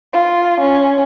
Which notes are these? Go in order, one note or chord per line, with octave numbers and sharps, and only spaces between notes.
F4
C#4